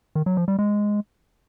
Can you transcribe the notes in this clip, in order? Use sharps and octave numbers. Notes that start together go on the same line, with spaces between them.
D#3
F#3
F3
G3
G#3